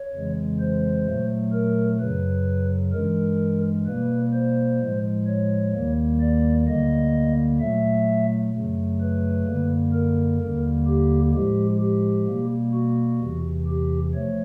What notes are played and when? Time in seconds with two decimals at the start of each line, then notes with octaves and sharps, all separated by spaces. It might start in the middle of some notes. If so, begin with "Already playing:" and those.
Already playing: C#5
0.13 F2 C#3 E3 G#3
0.60 C5
1.06 A#2 F#3 A3
1.53 A#4
2.00 F#2 C#3 F#3 B4
2.93 G2 E3 G#3 A#4
3.86 B2 G3 A#3 B4
4.34 C5
4.80 A2 F3 G#3
5.27 C#5
5.73 D#2 D#3 G3 A#3
6.20 D5
6.67 D2 D3 G3 A#3 D#5
7.60 A#2 F#3 A3 E5
8.54 F#2 C#3 F#3 A3
9.01 B4
9.47 F#2 D3 G3 A#3
9.93 A#4
10.41 D#2 D3 G3 A#3
10.87 G4
11.34 A2 F3 G#3 G4
11.80 G4
12.27 B2 G3 A#3
12.74 F#4
13.20 E2 C3 E3
13.67 G4
14.14 F3 A3 C#5